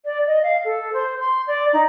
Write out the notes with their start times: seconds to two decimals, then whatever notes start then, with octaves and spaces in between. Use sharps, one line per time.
0.05 D5
0.27 D#5
0.43 F5
0.65 A4
0.93 C5
1.20 C6
1.47 D5
1.73 D#4